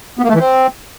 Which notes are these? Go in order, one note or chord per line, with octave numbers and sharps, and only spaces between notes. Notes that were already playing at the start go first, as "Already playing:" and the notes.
B3
A#3
A3
E3
C4